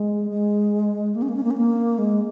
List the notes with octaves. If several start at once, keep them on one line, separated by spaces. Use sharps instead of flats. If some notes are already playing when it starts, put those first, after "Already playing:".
Already playing: G#3
G#3
A#3
C#4
A#3
C#4
A#3
C#4
A#3
G#3